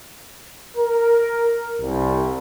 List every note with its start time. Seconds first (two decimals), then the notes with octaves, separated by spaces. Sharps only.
0.77 A#4
1.81 C2